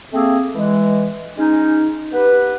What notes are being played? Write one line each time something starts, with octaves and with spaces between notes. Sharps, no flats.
A3 A#3 C4 G#4 A4
E3 G#3
G#3 C#4 D#4
B3 G4 B4